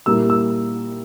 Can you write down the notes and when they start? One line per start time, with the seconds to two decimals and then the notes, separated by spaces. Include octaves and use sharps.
0.06 A#2 G3 A#3 E4 E6
0.30 E6